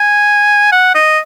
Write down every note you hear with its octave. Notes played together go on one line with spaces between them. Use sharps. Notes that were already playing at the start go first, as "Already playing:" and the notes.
Already playing: G#5
F#5
D#5